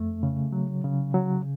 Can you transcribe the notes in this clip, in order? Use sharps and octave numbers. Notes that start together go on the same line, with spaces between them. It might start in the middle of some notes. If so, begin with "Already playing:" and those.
Already playing: F2 A3
C#3
F#3
C#3
F#3